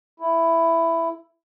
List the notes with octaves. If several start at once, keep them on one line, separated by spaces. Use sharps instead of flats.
E4